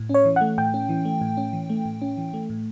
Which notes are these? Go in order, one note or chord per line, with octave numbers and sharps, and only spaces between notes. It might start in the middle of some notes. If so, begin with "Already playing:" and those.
Already playing: A2
C#4
C#5
E3
A3 F#5
A2 G5
C#4
E3
A3
A2
C#4
E3
A3
A2
C#4
E3
A3
A2